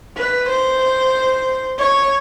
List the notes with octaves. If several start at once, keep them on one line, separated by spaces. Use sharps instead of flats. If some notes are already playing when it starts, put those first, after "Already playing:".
B4
C5
C#5